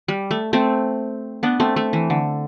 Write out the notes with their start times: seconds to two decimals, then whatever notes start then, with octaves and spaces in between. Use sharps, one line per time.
0.08 G3
0.31 A3
0.53 A3 C4
1.43 B3 D4
1.60 A3 C4
1.76 A3
1.93 E3
2.10 D3